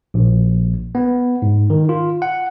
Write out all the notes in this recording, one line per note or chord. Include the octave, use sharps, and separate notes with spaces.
A#1
B3
G#2
D#3
F4
F#5